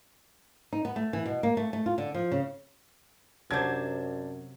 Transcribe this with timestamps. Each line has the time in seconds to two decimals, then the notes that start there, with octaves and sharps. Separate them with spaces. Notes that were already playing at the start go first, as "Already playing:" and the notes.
0.73 D#4
0.85 B3
0.96 A3
1.13 E3
1.26 B2
1.43 A#3
1.57 A3
1.73 A3
1.86 F4
1.98 D3
2.14 F3
2.32 C#3
3.51 F#2 C3 F#3 D4 C5 G#6